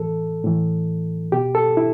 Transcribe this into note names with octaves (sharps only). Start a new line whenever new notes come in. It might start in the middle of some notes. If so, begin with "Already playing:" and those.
Already playing: A2 E3 A4
A2 E3
B2 G4
A4
E4